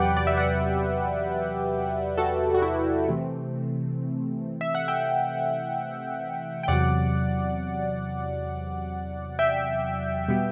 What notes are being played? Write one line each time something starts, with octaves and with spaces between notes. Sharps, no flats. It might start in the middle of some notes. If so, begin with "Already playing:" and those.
Already playing: E2 C3 F#3 G4 B4 D5 F#5 G5
D5
E5
D5 F#5
F#4 A4
F#4
E4
C3 E3 A3 C4
E5
F#5
E5 G5
G5
E2 C3 F#3 D5 F#5
E5 G5
B2 G3 B3